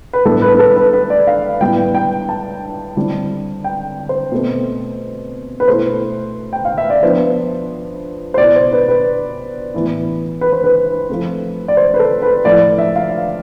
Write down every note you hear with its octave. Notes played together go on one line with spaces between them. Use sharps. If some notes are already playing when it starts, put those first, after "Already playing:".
B4
A2 G3 B3 D4 A4
B4
B4
A4
B4
B4
D5
F5
A2 G3 B3 E4 G5
G5
A5
D3 G3 C4 E4
G5
C5
B2 A3 C4
B4
B2 A3 E4 C5
G5
F5
E5
D5
F3 B3 D4 C5
C5
B2 B3 E4 D5
C5
B4
B4
A2 E3 B3 E4
B4
C5
B4
F3 A3 C4
D5
C5
B4
A4
B4
A2 F3 A3 E4 D5
E5
F5